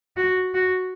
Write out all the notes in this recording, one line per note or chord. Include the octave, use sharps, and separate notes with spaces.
F#4
F#4